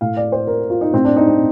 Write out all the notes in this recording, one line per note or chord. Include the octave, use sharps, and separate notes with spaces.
A2 F5
D5
C5
A#4
F4
D#4
A2 C4
D4
D#4
C4